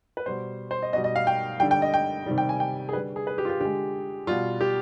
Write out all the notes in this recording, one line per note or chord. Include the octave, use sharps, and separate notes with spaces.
B4
B2 G3 C5
C5
D#5
B2 G3 D#5
D#5
F5
G5
D3 G3 G5
G5
D#5
G5
C3 D#3 G3
G5
G#5
G5
G#4
D3 G3 B4
G#4
B4
G4
F4
G4
D3 G#3 G4
B2 G3 F4
G4